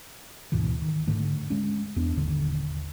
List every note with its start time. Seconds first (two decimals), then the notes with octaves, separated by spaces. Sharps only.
0.52 D2 G#2 B2 E3
0.82 D#3
1.07 G#2 D3 A3
1.50 G#3 C#4
1.96 E2 B3 D4
2.17 D#1 G#1 D#2 D3